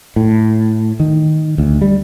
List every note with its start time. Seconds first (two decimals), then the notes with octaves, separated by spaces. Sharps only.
0.16 A2
1.00 D#3
1.58 D2
1.82 G3